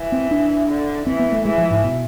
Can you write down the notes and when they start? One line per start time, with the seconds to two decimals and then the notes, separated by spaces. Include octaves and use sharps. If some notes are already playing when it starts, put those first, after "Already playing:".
Already playing: E3
0.12 C4
0.31 D4
0.69 D3
1.06 E3 C4
1.19 B3
1.32 A3
1.45 E3 G#3
1.58 F3
1.71 G#2
1.84 B2